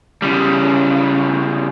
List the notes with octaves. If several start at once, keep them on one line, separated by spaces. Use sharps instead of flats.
C#3 G3